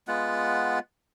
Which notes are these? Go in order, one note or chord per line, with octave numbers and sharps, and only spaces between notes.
G#3 B3 F4 F#5